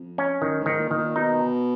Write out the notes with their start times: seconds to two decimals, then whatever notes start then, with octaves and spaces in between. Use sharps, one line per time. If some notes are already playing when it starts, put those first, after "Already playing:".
Already playing: F2
0.18 C#4
0.42 F#2 D#3
0.61 G#2
0.66 D#3
0.79 A#2
0.91 D#3
0.97 A#2
1.16 B2 D#4